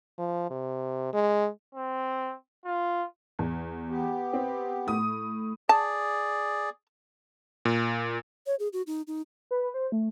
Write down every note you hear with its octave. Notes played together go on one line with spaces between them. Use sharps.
F3
C3
G#3
C4
F4
E2
B3 G4
C4
A2 D#6
G#4 D5 A5
A#2
C#5
G#4
F#4
D#4
D#4
B4
C5
A3